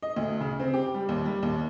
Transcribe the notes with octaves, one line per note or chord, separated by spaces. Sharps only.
D#5
D2
C#3
C4
G4
G3
D#2
G3
D#2